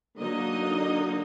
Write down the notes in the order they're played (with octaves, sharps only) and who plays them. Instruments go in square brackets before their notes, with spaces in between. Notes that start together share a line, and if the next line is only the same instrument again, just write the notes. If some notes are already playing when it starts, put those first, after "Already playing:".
[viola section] D3 F#3 A#3 D#4 D#5